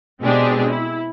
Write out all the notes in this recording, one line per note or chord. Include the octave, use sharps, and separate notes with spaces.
B2 G#3 C4 D4 G4 G#4
E4